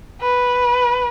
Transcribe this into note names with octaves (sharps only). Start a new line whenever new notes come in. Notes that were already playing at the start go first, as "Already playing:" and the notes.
B4